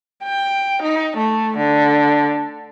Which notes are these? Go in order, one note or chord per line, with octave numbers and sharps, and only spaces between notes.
G5
D#4
A3
D3